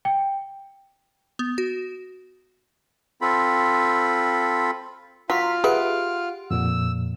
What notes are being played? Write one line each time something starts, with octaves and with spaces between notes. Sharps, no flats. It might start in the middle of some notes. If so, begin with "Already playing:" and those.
G5
B3
F#4
C4 F4 A4 B5
F#3 F4 F5 A#5 C6 B6
G4 G#4 B4 E5 F#5
F2 A#2 E6